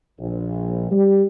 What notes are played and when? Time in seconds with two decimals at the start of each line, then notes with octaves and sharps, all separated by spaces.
0.20 A#1
0.92 G3